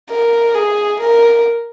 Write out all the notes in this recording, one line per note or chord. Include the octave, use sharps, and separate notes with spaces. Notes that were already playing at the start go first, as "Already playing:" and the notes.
A#4
G#4
A#4